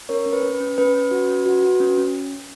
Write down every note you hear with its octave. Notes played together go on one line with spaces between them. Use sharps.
C#4 A#4 C#5
C#4
B4
C#4
B4
C#4
C#4 B4
C#4
F#4
C#4
F#4
F#4
C#4
C#4